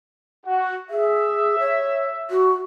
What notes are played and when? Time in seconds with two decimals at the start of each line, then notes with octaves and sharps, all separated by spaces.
0.46 F#4
0.90 G#4 E5
1.60 C#5
2.31 F#4